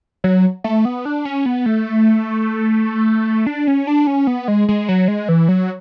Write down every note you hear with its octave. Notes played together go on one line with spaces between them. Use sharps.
F#3
A3
B3
D4
C#4
B3
A3
D4
C#4
D4
C#4
B3
G#3
G#3
F#3
G#3
E3
F#3